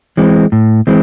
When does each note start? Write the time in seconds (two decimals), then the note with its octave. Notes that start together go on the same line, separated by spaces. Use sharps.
0.17 E3 G#3 C4
0.52 A2
0.87 E3 G#3 C4